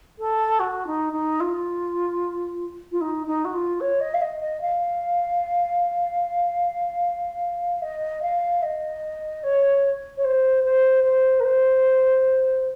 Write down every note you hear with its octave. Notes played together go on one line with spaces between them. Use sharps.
A4
F#4
D#4
D#4
F4
F4
D#4
D#4
F#4
F4
C#5
D#5
F5
D#5
D#5
F5
D#5
F5
D#5
C#5
C#5
C5
C5
C5
A#4
C5